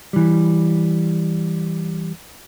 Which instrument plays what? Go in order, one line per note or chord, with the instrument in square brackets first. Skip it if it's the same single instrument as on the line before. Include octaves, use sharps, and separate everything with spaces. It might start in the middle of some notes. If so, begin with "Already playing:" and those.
[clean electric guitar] E3 G3